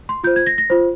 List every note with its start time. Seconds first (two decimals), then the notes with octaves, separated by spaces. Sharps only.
0.09 C6
0.24 F4 G6
0.27 C5
0.36 G#6
0.47 A#6
0.58 A#6
0.70 F4 C5